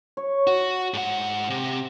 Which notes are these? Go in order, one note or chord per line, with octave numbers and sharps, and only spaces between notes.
C#5
F#4
G#2 F#5
C3